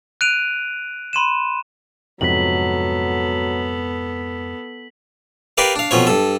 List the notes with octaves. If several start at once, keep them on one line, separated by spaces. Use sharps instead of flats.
F#6 D7 D#7 F7
B5 C6 D#7 E7
F2 G#2 C3 F#3 B3 A4 B6 F#7
G4 A#4 B4 D5 F5
D4 F5
F2 B2 F4 C#5
G2 A4